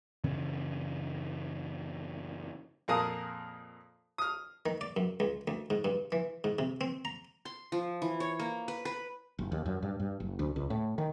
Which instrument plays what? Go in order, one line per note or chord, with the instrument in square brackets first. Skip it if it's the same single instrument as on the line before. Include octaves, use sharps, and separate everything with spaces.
[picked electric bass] F#2 C#3 E3 C#4
[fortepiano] F2 A#2 G#4 A#4 A5 D#6
D#6 F6
[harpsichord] D#3
D5
F#2
C#2
D2
G#2
G2
E3
G#2
C3
C4
A#5
[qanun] C6
F3
E3
C#5
A#3
B4
B4
[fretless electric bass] F#1
D#2
F#2
G2
G2
F#1
D2
C#2
A2
D#3